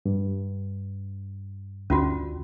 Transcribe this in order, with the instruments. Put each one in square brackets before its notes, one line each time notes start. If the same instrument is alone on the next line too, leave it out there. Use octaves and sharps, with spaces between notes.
[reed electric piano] G2
[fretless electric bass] D2 [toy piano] C#4 F4 F#4